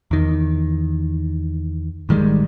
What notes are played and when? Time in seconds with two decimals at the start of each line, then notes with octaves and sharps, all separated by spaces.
0.11 E2 D#3
2.09 A1 D#3 G3 G#3